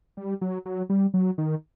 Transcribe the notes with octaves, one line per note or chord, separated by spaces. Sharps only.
G3
F#3
F#3
G3
F#3
D#3